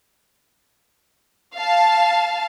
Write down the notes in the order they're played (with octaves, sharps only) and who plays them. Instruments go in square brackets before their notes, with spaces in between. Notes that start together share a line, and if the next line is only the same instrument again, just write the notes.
[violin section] F5 A5